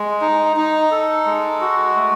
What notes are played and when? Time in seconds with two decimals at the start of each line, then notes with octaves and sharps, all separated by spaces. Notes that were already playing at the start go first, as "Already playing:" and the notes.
Already playing: G#3
0.21 D#4
0.57 D#4
0.91 A4
1.26 G#3
1.61 F#4
1.96 A3